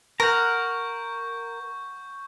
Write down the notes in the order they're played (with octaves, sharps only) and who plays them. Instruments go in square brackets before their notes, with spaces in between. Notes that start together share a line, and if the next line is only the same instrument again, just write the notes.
[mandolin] A#4 [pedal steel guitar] F#5 A#5 [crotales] C#6 G6